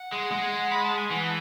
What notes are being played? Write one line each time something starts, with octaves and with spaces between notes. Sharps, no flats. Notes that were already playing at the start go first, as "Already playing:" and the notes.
Already playing: F#5
G#3
G#3
B5
A5
G#5
E3 F#5
A5